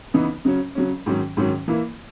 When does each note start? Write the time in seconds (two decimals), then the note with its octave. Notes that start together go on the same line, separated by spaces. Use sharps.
0.14 C#3 E3 B3 D#4
0.45 C#3 F#3 C#4
0.75 C#3 F#3 C#4
1.06 G#2 D#3 F#3 C#4
1.37 G#2 D#3 F#3 C#4
1.68 E3 A#3 E4